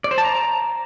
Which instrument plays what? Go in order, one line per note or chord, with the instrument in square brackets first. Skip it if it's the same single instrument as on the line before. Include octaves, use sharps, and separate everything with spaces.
[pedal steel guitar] D5
C5
A5
A#5